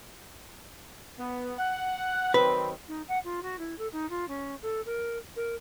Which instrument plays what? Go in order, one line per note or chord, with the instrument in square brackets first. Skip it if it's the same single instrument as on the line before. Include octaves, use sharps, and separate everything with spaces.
[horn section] B3
F#5
[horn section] D#3 F#3 C4 [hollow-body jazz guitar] B4
[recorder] D#4
F#5
F4
F#4
E4
A4
D#4
F4
C#4
A4
A#4
A#4